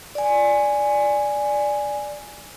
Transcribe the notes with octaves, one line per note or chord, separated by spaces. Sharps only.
D5 G#5